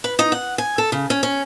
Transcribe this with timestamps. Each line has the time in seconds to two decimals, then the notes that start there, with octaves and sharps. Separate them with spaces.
0.04 B4
0.19 D#4
0.32 F#5
0.58 G#5
0.78 A4
0.92 C#3
1.10 C#4
1.23 C#4